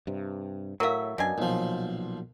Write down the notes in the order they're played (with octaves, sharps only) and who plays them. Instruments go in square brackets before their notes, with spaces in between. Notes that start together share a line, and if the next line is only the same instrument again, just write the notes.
[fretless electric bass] G2 C3
[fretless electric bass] A2 [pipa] F#3 E5 [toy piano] A#4 F5
[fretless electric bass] F#2 F#3 [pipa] B2 D4 G#5
[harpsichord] B1 F3 [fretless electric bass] A#2 F#3